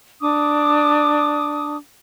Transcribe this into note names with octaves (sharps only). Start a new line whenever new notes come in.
D4 D6 D#6